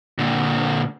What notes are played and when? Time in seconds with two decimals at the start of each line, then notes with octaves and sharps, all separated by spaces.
0.19 A#2 D3